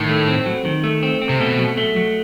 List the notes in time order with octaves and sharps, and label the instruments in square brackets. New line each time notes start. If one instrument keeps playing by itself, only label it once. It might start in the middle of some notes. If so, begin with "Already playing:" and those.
Already playing: [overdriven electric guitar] A2 [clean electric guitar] D#3
[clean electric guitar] A3
C4
F#3
D#3
A3
C4
C4
[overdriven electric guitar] C3
[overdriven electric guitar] B2 [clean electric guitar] A3
[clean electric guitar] F#3
A3
F#3